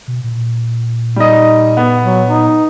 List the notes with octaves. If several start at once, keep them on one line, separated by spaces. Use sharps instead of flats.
B2
A#2
G3 D#4 D#5
B3
F#3
D#4